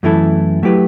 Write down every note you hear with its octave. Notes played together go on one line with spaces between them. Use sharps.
F#2 E3 A3 E4 A4
F#3 A3 E4 G4 B4